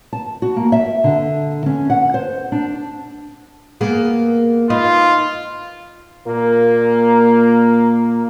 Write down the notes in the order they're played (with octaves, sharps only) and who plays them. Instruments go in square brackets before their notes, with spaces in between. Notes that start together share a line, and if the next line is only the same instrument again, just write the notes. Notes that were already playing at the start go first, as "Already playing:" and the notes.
[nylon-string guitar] A5
F#4
A#3
E5
D3
C#4
F#5
C5
D4
[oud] A#3 B3 G#4
[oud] D#4 B4 [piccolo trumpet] F4
[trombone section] A#2 A#3